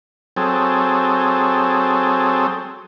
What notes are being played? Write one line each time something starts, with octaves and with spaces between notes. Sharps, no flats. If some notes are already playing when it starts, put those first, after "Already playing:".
F#3 C4 G#4 A4